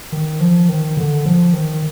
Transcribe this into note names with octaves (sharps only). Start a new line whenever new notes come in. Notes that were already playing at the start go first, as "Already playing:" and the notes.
D#3
F3
D#3
D3
F3
D#3